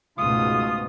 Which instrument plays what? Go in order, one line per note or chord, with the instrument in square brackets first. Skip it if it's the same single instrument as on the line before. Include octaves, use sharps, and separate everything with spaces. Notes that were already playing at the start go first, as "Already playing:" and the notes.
[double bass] C#2 A3 [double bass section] G#2 B2 [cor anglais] F4 [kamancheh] D#6